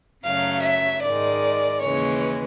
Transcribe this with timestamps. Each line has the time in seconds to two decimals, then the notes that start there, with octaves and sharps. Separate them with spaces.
0.25 F#2 C#3 F#3 A3 F5
0.64 E5
1.04 G#2 D#3 G#3 D5
1.83 D#2 C#3 E3 G#3 C#5